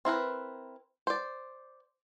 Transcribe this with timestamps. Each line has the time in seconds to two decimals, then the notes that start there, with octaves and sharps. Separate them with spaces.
0.05 C4 E4 A#4 B4
1.07 C5 D5